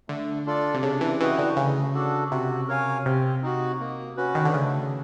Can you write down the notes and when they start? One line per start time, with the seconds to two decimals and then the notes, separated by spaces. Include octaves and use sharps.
0.09 D3 A3
0.46 D4 F4 A4 D5
0.74 C3
0.83 C#3 D4
1.01 E3
1.20 E3 F#4 B4 D#5 G5
1.39 D3
1.57 C#3 A3
1.94 D4 F#4 A4
2.31 C3 F#4
2.68 A#4 C#5 F5 G#5
3.06 C3 C4
3.43 D#4 F#4
3.80 A#3
4.17 C#4 F#4 B4
4.35 D#3
4.45 D3
4.54 C#3 A3